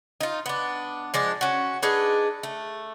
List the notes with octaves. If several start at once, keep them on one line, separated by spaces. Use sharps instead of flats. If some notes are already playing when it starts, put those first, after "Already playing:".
D#4 F4
B3 D4
F3 G#3 D4
C#4 F#4
D4 D#4 G#4 B4
A3